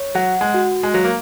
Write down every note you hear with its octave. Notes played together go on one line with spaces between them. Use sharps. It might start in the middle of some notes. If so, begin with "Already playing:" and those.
Already playing: C#5
F#3 F#5
G#3
F#4
G#3
F#3 F5
A#3